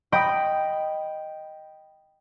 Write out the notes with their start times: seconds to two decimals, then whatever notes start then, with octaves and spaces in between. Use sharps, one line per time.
0.12 D#5 G5 B5 D#6